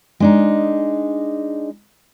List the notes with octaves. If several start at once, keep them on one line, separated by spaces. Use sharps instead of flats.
G#3 D4 D#4